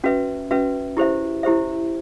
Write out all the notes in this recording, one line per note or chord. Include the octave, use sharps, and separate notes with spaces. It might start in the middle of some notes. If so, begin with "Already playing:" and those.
C#4 F#4 B4 E5
C#4 F#4 B4 E5
E4 G4 C5 E5
E4 G4 C5 E5